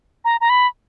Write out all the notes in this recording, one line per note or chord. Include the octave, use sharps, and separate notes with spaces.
A#5
A#5
B5